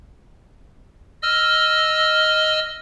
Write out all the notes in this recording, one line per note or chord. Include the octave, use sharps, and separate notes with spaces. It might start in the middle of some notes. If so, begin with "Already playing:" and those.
D#5 E6 F6